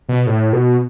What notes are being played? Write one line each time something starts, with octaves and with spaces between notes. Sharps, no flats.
B2
A2
B2